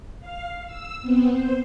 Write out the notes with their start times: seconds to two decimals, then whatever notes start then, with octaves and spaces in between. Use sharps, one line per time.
0.20 F5
0.66 E6
1.02 B3 C4
1.32 C5